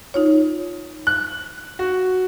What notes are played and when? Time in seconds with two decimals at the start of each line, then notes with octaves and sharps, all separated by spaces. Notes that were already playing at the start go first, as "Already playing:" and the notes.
0.14 D#4 F4 C#5
1.07 F#6
1.79 F#4